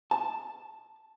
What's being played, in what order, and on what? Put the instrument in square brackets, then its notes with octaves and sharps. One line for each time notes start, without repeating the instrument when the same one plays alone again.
[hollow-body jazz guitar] A5